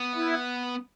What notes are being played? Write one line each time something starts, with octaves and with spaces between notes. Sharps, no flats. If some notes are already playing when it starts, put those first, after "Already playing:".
Already playing: B3
E4